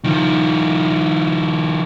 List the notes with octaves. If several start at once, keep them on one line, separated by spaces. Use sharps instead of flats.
D#3 F3